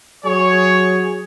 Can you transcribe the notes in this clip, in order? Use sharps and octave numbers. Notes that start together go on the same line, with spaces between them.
F#3 F#4 G#4 C#5